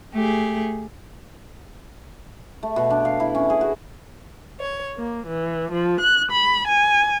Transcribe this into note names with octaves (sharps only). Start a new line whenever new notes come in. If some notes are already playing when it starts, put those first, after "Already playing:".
A3 G4 G#4
A3
B2
D4
F5
E4
C#4
G#4
F#4
C#5
A#3
E3
F3
F#6
B5
G#5